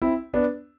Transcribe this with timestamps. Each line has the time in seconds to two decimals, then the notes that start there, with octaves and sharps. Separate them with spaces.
0.02 C4 E4
0.33 B3 D4